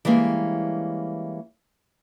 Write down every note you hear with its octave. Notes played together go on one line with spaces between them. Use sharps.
E3 G3 G#3 A#3 C#4